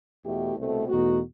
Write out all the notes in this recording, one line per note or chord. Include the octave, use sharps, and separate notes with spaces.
E2 B2 A3 E4 G4
C2 B2 A3 C4
E2 B2 A3 D#4 F#4